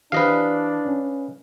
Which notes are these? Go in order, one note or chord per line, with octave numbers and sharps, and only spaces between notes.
E3 D4 G4 B4 C5 D#5 F5
C#4